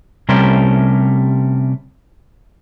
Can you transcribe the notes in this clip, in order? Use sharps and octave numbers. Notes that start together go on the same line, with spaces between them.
C3 G3 A3 C#4 A#4 C5